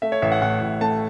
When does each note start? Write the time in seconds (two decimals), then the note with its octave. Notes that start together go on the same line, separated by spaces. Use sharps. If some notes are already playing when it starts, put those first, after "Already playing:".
0.02 A3 E5
0.12 C#5
0.22 A1 E5
0.32 F#5
0.42 A2 F#5
0.61 A1
0.81 A3 A5